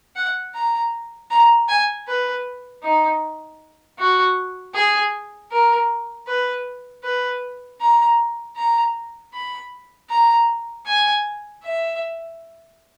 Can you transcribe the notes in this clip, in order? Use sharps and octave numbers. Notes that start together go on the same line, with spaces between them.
F#5
A#5
A#5
G#5
B4
D#4
F#4
G#4
A#4
B4
B4
A#5
A#5
B5
A#5
G#5
E5